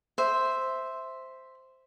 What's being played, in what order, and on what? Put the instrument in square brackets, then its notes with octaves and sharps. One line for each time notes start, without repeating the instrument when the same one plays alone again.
[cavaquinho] C5 E5